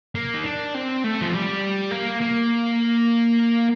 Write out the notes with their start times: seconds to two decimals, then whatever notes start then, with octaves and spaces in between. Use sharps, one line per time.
0.15 A#3
0.34 D#4
0.45 D4
0.74 C4
1.04 A3
1.21 F3
1.33 G3
1.91 A#3
2.21 A#3